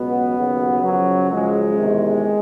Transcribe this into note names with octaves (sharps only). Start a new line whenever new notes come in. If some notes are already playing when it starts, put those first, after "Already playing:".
Already playing: C#2 B2 F#3 B3
D#2 C#3 F#3
F#2 C#3 F3 F#3
F#2 C#3 F3 G#3
E2 C3 D#3